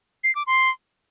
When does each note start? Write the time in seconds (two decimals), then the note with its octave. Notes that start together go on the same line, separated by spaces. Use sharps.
0.24 C7
0.35 D6
0.47 C6